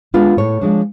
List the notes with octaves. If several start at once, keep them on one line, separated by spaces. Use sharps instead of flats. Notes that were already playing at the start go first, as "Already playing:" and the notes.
G#3 B3 D4 F4
A2 C#5
F3 G#3 D4